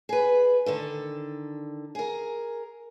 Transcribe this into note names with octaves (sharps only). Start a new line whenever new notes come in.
G#4 B4
D3 D#3 A4
G#4 A#4